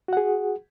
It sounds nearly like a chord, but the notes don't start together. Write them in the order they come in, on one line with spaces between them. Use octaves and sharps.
F#4 F#5 G#4